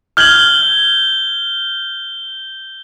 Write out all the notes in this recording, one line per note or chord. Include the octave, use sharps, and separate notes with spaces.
F6 G6 G#6 F#7 G7